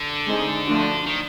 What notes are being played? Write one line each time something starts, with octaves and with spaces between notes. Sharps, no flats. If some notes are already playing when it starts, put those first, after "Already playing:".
Already playing: D3
G#3 C4 D#4 G#4
F3 A3 D4 F#4
D#3